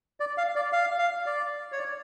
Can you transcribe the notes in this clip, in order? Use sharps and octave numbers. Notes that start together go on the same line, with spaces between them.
D5
F5
D5
F5
F5
D5
C#5
D5